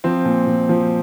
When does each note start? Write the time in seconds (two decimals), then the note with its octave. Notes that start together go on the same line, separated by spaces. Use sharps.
0.04 F3 C4
0.25 A#2
0.47 A#2
0.69 F3